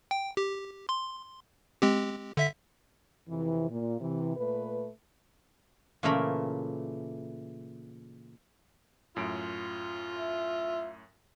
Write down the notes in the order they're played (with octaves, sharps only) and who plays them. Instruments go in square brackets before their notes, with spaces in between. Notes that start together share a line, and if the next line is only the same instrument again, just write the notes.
[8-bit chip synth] G5
G4
C6
G#3 C4 G4
D3 E5 B6
[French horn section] F2 C3 E3
A#2
C3 E3
A#2 A3 B4
[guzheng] A#2 C#3 E3 A3 A#4 B5
[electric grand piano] F#2 A2 D7 [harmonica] F4
[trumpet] E5